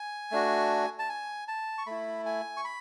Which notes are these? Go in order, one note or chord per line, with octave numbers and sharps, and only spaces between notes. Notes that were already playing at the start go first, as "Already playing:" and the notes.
Already playing: G#5
A3 D4 F#4
A5
G#5
A5
C#6
A3 E4 B5
G#5
C#6
B5